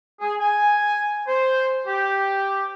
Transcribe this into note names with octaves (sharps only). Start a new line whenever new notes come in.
G#4
G#5
C5
G4